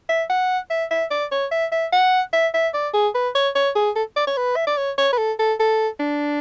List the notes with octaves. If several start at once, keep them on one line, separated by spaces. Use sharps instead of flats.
E5
F#5
E5
E5
D5
C#5
E5
E5
F#5
E5
E5
D5
G#4
B4
C#5
C#5
G#4
A4
D5
C#5
B4
E5
D5
C#5
C#5
B4
A4
A4
A4
D4